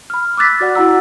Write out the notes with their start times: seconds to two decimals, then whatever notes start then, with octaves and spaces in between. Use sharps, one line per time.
0.10 B5 F6
0.37 D6 E6 F#6 A6 B6
0.61 F#4 D5 F#5
0.75 E4 F#4 F#5 A#5 E6